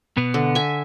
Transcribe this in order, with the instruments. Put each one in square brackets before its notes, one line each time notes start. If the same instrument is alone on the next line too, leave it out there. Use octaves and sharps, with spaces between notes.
[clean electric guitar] B2 B3
[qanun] D3
E5 G#5